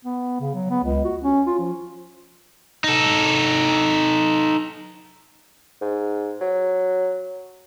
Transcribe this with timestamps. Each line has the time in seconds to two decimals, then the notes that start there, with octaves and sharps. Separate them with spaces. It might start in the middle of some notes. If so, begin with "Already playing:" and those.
0.05 B3
0.40 C#3
0.54 F#3
0.70 B3
0.84 C#2
1.04 F#4
1.22 C#4
1.47 F4
1.59 F3
2.84 D#4 A4
5.81 G#2
6.41 F#3